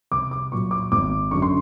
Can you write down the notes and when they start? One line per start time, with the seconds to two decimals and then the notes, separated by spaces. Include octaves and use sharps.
0.11 C2 D6
0.31 D6
0.52 A#2 F#3 C#6
0.71 D6
0.92 G#1 D6
1.31 F#2 D3 C#6
1.42 C6